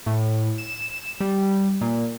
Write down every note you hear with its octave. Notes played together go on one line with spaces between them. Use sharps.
A2
E7
G3
A#2